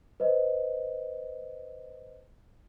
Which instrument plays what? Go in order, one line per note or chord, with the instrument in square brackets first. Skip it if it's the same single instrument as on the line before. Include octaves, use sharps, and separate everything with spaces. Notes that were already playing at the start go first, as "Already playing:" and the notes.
[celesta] B4 C5 D#5